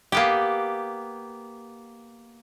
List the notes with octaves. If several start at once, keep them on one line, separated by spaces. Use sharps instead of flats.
A#3 B3 G4